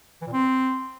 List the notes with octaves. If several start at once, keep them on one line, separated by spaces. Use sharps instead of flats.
E3
A#2
C4